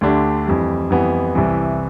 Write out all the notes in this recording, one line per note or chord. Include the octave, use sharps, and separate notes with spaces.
D2 D3 A3 D4 G4
F2 E3 G3
F2 E3 G3 B3
C2 C3 E3